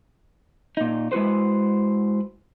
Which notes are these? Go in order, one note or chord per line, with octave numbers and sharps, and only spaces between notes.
A#2 D#4
G#3 E4 F#4 B4 C5